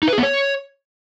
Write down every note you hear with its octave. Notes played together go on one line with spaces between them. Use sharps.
D#4
B4
G#4
B3
C#5